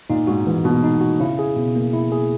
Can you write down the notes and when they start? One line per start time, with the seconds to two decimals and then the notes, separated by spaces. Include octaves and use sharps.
0.10 A#2 D#4
0.27 G#2 F#4
0.47 G#2 E3
0.64 B2 A#3
0.83 D#4
1.01 F#4
1.20 C#3 E4
1.39 G#4
1.56 B2
1.75 A#3
1.93 E4
2.12 G#4